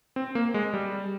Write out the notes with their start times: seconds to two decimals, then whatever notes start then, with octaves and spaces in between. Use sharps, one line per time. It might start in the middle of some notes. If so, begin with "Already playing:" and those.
0.16 C4
0.35 A#3
0.54 G#3
0.74 G3